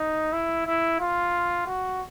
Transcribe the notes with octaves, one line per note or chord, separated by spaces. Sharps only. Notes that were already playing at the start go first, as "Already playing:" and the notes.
Already playing: D#4
E4
E4
F4
F#4